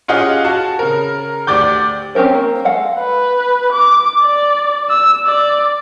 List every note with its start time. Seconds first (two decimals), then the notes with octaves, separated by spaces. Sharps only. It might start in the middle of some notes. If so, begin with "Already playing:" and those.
0.08 C#4 F4 G4 G#4 D#5 F#5
0.45 F#4 A5
0.79 C#3 A#4
1.47 D2 G4 D5 D6 G6
2.15 C4 C#4 G4 A#4 C5
2.35 A#3
2.65 G#3 A4 F5 F#5
2.99 B4
3.72 D6
4.21 D5
4.89 E6
5.26 D5